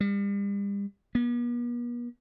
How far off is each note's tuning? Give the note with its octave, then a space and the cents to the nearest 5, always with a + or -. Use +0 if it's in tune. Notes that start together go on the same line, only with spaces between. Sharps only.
G3 +40
B3 -45